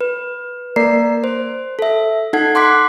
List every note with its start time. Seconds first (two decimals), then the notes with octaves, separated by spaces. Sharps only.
0.01 B4
0.76 A#3 A#4 D5 A#5 C7
1.24 C5
1.79 A4 E5
2.33 D#4 A4 F#5 G#6
2.55 F#5 C6 D6 F#6 B6